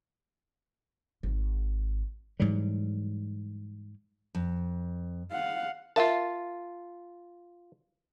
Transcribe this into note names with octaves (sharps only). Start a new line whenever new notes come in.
G#1
G#2 E3 F#3 G3
F2
F5 F#5
F4 A#4 E5 F5 A5